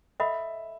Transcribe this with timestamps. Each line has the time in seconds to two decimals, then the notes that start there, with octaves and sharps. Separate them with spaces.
0.20 A4 D#5 E5 F#5 B5